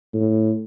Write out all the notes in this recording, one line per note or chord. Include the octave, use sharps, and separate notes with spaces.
A2